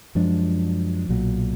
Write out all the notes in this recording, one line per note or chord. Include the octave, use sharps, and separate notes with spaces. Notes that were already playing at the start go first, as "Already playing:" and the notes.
F#2 F3 G#3 D4
B1 A#2 F#3